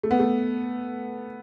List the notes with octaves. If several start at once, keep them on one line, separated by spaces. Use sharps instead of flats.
A3
B3
A3